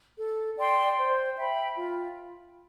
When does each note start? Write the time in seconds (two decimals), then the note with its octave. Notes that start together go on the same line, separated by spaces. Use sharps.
0.18 A4
0.56 D5 G5 C6
0.96 C5
1.36 E5 G5 B5
1.76 F4